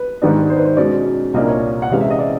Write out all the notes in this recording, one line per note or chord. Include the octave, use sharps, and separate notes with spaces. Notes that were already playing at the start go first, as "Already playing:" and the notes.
Already playing: B4
G#2 D#3 G3 B3 D4
C5
B4
C5
B2 G#3 C#4 D5
C2 A#2 G3 A#3 D4 D#5
C#5
F#5
C3 E3 G#3 C#4 F5
E5
D#5
D5